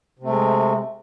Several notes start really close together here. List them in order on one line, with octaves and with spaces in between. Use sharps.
C3 A3 G#3